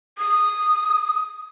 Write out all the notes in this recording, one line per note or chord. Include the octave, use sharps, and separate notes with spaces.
D#6